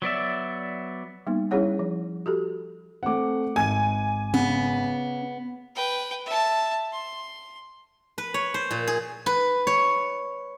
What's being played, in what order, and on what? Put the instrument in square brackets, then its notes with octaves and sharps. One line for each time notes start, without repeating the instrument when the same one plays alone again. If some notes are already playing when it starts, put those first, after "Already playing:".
[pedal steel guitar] F#3 B3 D5 E5
[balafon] G3 A#3 B3 D#4
G3 C#4 E4 G#4 C#5 F#5
F3
F#4 G4 A4
[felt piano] A3 C4 [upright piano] F#5 D6
[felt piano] G#1 G#6 [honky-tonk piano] G#5
[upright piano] C#3 [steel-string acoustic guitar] B3
[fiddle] B4 G5
E5 A5
C6
[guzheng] B4
C#5
C5
A#2
G#4
B4
C#5